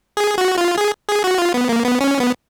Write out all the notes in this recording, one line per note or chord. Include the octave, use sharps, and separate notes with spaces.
G#4
F#4
F4
G#4
G#4
F#4
F4
B3
A#3
B3
C#4
B3